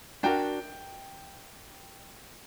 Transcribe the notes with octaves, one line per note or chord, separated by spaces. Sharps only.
D4 F#4 A#4 G5